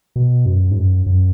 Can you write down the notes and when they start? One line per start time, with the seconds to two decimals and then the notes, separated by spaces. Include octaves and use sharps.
0.16 B2
0.46 F#2
0.71 G#2
0.76 F#2
1.06 F#2